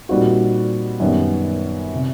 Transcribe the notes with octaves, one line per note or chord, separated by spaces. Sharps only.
A#2 G3 C4 D#4 F#4
F#2 D#3 G3 B3
C3